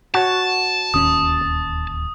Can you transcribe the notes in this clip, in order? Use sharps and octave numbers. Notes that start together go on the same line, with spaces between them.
F#4 C#5 A5
D1 D#2 C#4 D#6